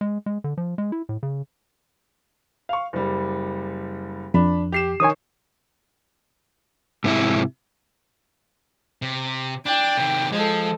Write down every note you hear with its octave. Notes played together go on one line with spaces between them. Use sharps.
G#3
G#3
D3
F3
G#3
E4
A2
C#3
F5 C#6
F#1 G3
F2 D4 B5
G4 C7 E7
D#3 C#5 G#5 C#6 D#6
G#2 C3 E4
C3
D4 G5
C3 D#3
F3 G#3 A4